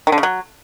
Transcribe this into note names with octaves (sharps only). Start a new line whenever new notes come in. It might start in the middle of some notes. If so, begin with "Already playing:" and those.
D#3
D3
C#3
F#3